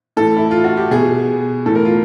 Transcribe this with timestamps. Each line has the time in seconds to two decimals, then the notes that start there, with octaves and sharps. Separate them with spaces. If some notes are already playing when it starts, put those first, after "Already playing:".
0.17 A2 E3 A4
0.37 E4
0.51 F4
0.64 F#4
0.77 G4
0.91 B2 G#4
1.66 A2 E3 A4
1.75 A#4
1.85 F4